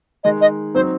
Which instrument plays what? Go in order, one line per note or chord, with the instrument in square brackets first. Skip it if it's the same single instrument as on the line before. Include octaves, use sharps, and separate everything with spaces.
[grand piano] D#3 G#3 D#4 [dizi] D#5
[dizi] D#5
[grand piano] F#3 C4 D#4 [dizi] C5